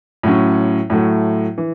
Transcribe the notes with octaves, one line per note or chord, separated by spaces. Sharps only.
A2 F#3 C#4
A2 F#3 A3
E3